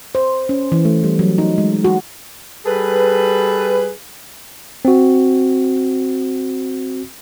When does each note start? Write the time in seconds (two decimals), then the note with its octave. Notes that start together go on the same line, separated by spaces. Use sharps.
0.15 C5
0.49 C#4
0.72 E3
0.85 A3
1.04 G3
1.19 F#3
1.38 D#4
1.58 G#3
1.84 F#4
2.66 G3 G#4 A4 B4
4.85 C4 F#4